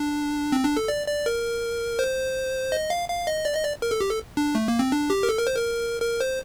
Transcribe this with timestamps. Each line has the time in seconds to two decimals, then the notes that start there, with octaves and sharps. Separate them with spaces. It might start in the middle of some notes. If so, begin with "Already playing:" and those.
Already playing: D4
0.52 C4
0.64 D4
0.77 A4
0.88 D5
1.08 D5
1.26 A#4
1.99 C5
2.72 D#5
2.90 F5
3.09 F5
3.27 D#5
3.45 D5
3.55 D#5
3.64 D5
3.82 A#4
3.91 A4
4.01 G4
4.10 A4
4.37 D4
4.55 A3
4.68 A#3
4.79 C4
4.92 D4
5.10 G4
5.23 A#4
5.29 A4
5.38 A#4
5.47 C5
5.56 A#4
6.02 A#4
6.20 C5